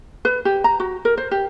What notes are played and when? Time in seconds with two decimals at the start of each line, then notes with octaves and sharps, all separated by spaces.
0.25 B4
0.45 G4
0.64 A#5
0.80 F#4
1.05 A#4
1.17 C5
1.31 G4